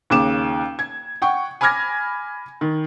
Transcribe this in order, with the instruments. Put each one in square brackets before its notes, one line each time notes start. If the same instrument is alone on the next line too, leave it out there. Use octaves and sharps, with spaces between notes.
[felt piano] D#2 C#3 D6 E7
G#6
F#5 G5 C#6
G#5 B5 D6 F6 G#6 A#6
D#3